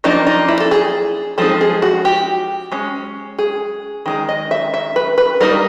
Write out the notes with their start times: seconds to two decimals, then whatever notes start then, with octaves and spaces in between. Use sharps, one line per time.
0.04 F3 A#3 D4 D#4
0.27 D#4
0.49 E4
0.60 A4
0.71 G#4
1.38 F3 G#3 C4 D#4 A4
1.61 G#4
1.82 F#4
2.05 G4
2.72 G#3 C#4
3.39 G#4
4.06 D#3 G#3 D#4
4.29 D#5
4.51 E5
4.74 E5
4.96 B4
5.18 B4
5.41 G3 A#3 D#4 A#4